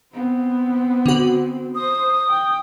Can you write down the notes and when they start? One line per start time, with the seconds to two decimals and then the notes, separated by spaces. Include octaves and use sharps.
0.14 B3 C4
1.06 D3 F#4
1.75 C5 D#6
2.29 G5